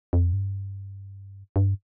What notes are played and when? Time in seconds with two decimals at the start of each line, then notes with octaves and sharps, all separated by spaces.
0.13 F2
0.33 G2
1.56 G2